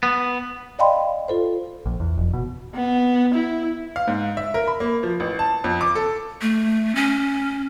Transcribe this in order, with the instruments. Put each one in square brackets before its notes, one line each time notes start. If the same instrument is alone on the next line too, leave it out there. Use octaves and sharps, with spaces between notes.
[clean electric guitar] B3
[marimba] D5 D#5 F5 G5 B5 C6
F4 A4 C5
[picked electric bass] A#1
E2
F1
B2
[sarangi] B3
E4
[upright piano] F5
G#2
E5
A#4
B5
A#3
F3
A1
A5
F2
D6
A4
[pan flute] A3
C#4